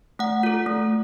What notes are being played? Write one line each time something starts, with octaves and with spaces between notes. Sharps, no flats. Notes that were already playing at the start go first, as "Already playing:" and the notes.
A3 F#5
F4 A4
A3